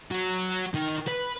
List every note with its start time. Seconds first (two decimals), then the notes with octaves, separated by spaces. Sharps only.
0.11 F#3
0.75 D#3
1.08 B4